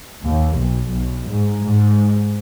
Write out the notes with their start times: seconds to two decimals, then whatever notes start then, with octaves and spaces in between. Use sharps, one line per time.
0.24 D#2
0.56 B1
0.91 B1
1.29 G#2
1.65 G#2